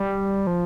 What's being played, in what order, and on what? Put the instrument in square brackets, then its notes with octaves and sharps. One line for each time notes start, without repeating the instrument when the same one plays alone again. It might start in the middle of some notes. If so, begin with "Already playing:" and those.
Already playing: [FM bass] G3
F3